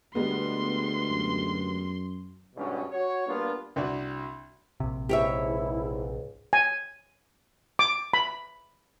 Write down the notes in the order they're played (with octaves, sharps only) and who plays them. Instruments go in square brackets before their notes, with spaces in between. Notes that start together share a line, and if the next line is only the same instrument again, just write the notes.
[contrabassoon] D2 [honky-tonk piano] G3 G#3 B3 [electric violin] C6
[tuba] F#2
[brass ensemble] G#1 G2 B2 C#4
F#4 C#5
G3 A#3 B3 D4 F4
[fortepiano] C2 D4 F#4
[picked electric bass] A#1 C3
[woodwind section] C#2 G#2 [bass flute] E4 [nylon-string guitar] G4 C#5 E5
[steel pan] G#5
D6
B5